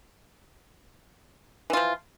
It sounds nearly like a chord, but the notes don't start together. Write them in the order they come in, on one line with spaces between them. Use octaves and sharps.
E3 F4 F3